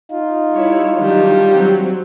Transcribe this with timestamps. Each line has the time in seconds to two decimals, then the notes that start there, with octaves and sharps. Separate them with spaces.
0.11 D#4 F4
0.51 G3 E4 C#5
0.96 D#3 F#3 G3 D4
1.48 F#3 C4